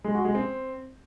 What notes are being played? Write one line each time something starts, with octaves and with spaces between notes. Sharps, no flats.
G#3
F#4
G#3
C4